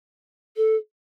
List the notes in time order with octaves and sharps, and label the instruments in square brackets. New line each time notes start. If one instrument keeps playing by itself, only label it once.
[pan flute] A4